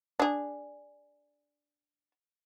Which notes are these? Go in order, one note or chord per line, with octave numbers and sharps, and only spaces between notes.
D4 G#4